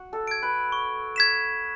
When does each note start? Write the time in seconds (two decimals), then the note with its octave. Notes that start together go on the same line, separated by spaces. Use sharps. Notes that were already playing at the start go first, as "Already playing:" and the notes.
Already playing: F#4
0.13 A4
0.27 G#6 D7
0.43 B4
0.72 C#6
1.16 G#6 B6 E7